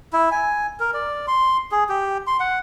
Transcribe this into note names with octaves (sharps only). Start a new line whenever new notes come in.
E4
G#5
A#4
D5
C6
G#4
G4
C6
F#5